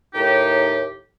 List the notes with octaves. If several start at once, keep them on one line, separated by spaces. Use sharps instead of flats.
D#2 A2 D#4 G4